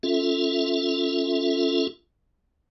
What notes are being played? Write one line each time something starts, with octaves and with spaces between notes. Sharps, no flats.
C#4 F4 A4 E5